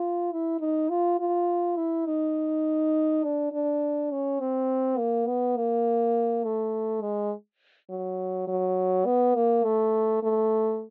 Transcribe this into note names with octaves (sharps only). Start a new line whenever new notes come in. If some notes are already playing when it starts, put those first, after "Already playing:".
Already playing: F4
E4
D#4
F4
F4
E4
D#4
D4
D4
C#4
C4
A#3
B3
A#3
A3
G#3
F#3
F#3
B3
A#3
A3
A3